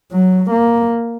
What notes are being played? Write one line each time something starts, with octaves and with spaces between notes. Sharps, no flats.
F#3
A#3